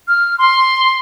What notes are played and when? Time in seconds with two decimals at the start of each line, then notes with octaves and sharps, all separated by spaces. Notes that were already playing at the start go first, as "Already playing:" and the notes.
0.08 F6
0.39 C6